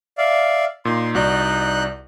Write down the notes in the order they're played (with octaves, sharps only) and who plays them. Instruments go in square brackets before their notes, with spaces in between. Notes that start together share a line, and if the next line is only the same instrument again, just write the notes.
[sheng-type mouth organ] D5 E5 F5
[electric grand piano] A#2 D#4 [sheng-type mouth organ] C6
[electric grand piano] C2 F#4 D5 [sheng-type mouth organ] D#4 F#6 G6